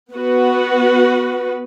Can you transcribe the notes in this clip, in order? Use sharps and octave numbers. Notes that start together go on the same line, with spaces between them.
B3 F#4 B4